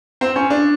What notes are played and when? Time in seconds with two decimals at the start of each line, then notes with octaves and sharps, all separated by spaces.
0.21 C4
0.36 C#4
0.50 D4